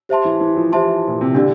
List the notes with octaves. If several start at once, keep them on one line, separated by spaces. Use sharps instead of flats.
G4 C5 E5 A5 C6
E3
E3
F3
E3 G4 C5 E5 A5 C6
A#2
C3
D3 D4 G4 D5